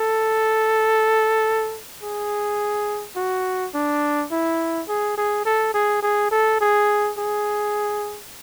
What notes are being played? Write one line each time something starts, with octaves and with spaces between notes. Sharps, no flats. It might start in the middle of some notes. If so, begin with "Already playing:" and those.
Already playing: A4
G#4
F#4
D4
E4
G#4
G#4
A4
G#4
G#4
A4
G#4
G#4